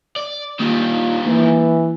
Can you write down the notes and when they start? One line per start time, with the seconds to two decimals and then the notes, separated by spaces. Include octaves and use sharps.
0.16 D5
0.60 D#3 G3 A#3 D4 D#4 F4
1.26 E3 A#3 D4